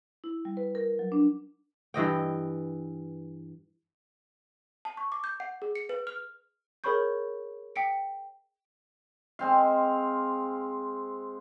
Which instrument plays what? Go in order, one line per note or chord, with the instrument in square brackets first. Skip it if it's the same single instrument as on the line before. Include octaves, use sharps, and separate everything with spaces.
[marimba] E4
G3
B4
A#4
F#3
D4
[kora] G2 E3 D#5 G5
[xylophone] A5
C#6
D6
G6
F#5
G#4
C#7
B4
F6
G#4 A#4 C#5 B5 C#6 G6
G5 B6 C#7 D7
[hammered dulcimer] G#3 C4 F5